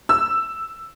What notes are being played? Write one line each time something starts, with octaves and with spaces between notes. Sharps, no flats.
E6